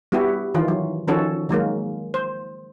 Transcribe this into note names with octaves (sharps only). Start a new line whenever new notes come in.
G3 B3 E4 F#4 G4
D#3 E3 F4
F#3
D#3 F3 C#4 F#4 A4
D#3 F#3 G#3 A#3
C5